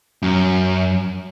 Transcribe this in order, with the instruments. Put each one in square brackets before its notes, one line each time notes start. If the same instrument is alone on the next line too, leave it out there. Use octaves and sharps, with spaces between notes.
[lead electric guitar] F#2